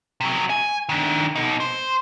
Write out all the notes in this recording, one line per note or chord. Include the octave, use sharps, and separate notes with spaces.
C3 F#3
G#5
D#3 D4
B2 D#4
C5